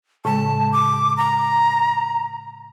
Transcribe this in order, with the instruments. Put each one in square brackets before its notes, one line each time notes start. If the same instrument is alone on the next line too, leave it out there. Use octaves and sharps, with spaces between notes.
[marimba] A2 C#3 G#3 [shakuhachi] A5
[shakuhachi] D6
A#5